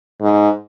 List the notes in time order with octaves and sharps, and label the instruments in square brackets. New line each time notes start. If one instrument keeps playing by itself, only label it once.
[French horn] G#2